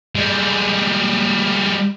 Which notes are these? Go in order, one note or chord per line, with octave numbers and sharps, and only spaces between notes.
G3 G#3